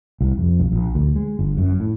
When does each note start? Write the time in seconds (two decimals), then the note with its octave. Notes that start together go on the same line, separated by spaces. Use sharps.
0.21 C2
0.38 F2
0.60 B1
0.72 A#1
0.95 D2
1.16 G#3
1.39 G1
1.57 F#2
1.80 A2